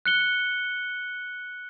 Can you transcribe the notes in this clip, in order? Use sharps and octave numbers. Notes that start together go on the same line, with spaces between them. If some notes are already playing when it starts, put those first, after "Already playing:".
F#6 C#7 G7